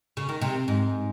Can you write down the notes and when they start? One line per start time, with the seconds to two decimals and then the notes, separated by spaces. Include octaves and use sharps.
0.17 C#3
0.29 D#3
0.41 C3
0.68 G#2